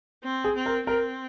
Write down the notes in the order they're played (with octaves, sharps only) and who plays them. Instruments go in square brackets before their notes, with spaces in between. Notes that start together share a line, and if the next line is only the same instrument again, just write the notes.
[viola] C4
[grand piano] G#4
[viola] C4
[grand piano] A#4
[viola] C4 [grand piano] A#4